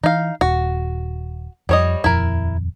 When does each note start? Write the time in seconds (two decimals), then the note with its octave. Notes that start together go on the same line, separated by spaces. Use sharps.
0.03 E3 D#4 F5
0.41 D#1 F#4
1.69 F2 F3 G3 C#5 D#5
2.04 D#1 F2 E4 A#4